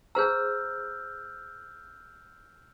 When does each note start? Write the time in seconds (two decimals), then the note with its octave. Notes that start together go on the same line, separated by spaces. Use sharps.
0.15 G#4 C5 A#5 E6 F6 G6